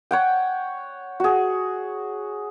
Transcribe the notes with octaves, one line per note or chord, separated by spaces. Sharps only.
C#5 F#5 G5
F#4 G#4